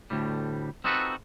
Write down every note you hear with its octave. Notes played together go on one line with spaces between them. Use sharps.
D2 A2 G3
C4 D#4 F4 F#4 A4 B4